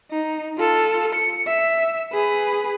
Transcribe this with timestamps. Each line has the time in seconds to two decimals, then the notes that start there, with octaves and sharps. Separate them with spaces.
0.11 D#4
0.58 F4 A4
1.15 C#7
1.47 E5
2.13 G#4 B4